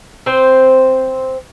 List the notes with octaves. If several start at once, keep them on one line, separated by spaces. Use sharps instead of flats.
C4 C5